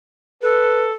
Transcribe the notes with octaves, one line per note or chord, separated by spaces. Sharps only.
A4 B4